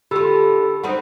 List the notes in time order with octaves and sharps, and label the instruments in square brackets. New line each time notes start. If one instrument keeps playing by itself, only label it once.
[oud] D3 F4 [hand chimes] G4 B5 E6
[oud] G3 C4 D#4 [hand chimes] F#5 B5